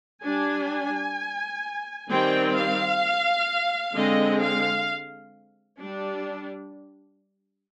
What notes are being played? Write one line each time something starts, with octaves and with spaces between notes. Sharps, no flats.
G3 D4 G#5
D#3 G3 C4 G5
F5
D3 G#3 C4 D#5
F5
G3 D4